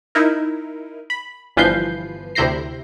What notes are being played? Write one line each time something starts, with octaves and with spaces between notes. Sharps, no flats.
D#4 E4 A#4
B5
G1 E3 F3 B4 G6 C7
D2 C3 E4 G6 A#6 C7